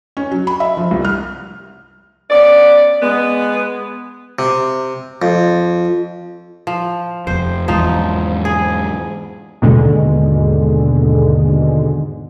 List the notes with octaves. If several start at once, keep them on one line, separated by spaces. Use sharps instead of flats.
C#4
F#3
B5
E5
F3
C2
F6
B3 C#4 D5
G#3 B3
C3
F2
F3
F1 F2 C5
E2 G#2 F3 D#4
G#4
D#2 G#2 B2 D3 G#3